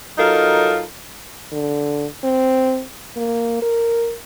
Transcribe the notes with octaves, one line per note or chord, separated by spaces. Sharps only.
F#3 D#4 F4 A4 A#4
D3
C4
A#3
A#4